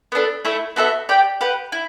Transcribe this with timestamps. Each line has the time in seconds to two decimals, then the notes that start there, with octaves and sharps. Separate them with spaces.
0.12 B3 D4 A4
0.45 A3 E4 A4 E5
0.76 B3 F#4 A4 E5
1.09 G4 D5 G5
1.41 G4 B4 F#5
1.72 E4